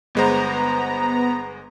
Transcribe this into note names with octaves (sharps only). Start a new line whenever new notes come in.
G1 G#3 B3 C5 A#5